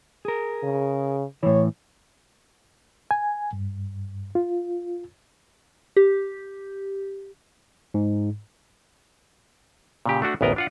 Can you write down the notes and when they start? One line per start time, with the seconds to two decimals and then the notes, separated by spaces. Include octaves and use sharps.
0.25 G#4 A#4
0.63 C#3
1.43 A2 E3 C#5
3.11 G#5
3.53 G2
4.35 F4
5.97 G4
7.94 G#2
10.06 A#2 C#3 G4
10.22 A3 D4 F#4
10.41 A1 D2 B3 A#4 D#5 A#5
10.56 D4 F4 F#5